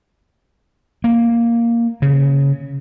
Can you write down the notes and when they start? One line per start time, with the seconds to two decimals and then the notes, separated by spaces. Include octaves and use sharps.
1.04 A#3
2.02 C#3